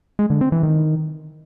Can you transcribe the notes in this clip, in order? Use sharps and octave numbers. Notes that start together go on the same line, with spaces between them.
G#3
D3
C4
E3
D#3